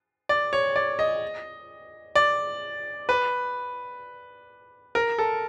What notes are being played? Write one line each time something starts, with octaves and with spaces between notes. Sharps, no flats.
D5
C#5
D5
D#5
D5
B4
A#4
A4